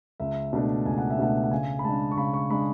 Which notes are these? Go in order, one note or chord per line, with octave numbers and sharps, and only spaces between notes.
C#2 E5
B2 A3 D4
C#2 G#5
F#5
E5
B2 A3 D4 F#5
F#5
C#3 G#5
B5
G#3 D4 A5
C#6
C#3 B5
C#6
G#3 D4 B5